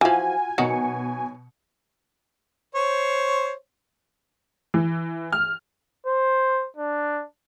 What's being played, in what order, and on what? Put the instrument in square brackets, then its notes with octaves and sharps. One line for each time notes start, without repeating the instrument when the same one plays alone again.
[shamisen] E3 F3 [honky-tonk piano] F4 F#4 [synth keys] G#5
[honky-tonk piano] B2 C#7 [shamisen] D#3 F#3 F#4
[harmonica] C5 C#5
[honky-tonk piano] E3
F6
[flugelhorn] C5
D4